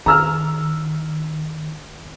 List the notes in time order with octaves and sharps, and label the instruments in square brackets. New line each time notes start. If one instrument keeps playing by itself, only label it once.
[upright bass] D#3 [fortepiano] A#5 E6 F6